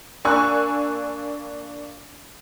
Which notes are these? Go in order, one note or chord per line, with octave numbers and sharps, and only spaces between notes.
A#3 D4 G#5 C#6 E6 F#6